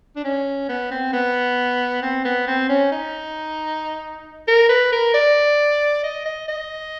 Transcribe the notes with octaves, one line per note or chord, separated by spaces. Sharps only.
D4
C#4
B3
C4
B3
C4
B3
C4
C#4
D#4
A#4
B4
A#4
D5
D#5
D#5
D#5